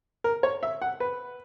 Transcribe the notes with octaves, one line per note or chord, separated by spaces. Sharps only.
A#4
C#5
E5
F#5
B4